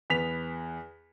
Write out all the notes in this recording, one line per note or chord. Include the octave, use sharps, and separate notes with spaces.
E2 B3 B6 F7